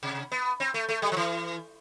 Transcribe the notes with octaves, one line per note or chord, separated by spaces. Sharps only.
C3
B3
C4
A3
A3
G3
F3
E3